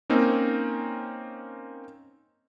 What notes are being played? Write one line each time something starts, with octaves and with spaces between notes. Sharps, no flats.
A#3 C4 C#4 D#4